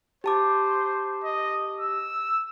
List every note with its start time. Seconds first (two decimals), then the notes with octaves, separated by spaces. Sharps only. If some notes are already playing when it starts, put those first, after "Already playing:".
0.24 G4 C5 A5 D6
1.24 D#5
1.81 E6